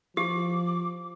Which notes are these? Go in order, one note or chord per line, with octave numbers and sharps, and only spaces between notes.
F3 G4 D6